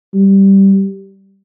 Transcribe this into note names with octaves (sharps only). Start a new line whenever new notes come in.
G3